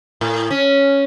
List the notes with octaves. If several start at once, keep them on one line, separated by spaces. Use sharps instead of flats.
A2
C#4